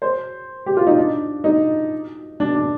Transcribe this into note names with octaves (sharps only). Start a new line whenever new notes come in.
C5
G4
F4
D#4
D4
D#4
D4
D4